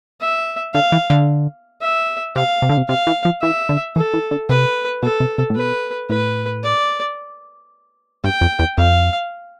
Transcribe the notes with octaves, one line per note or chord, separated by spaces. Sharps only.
E5
D3 F5
E3
D3
E5
C3 F5
C3
D3
C3
C3 F5
E3
F3
E3 E5
D3
E3 A4
E3
D3
C3 B4
B2 A4
C3
C3
A2
B2 B4
A2 B4
D5
G2 G5
F2
E2
F2 F5